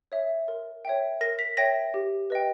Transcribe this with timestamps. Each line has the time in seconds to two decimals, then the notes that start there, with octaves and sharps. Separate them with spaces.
0.12 C#5 E5
0.48 A#4
0.85 C#5 E5 G5
1.21 A#4 A#6
1.39 B6
1.57 C#5 E5 G5 A#6
1.94 G4
2.30 B4 D#5 G5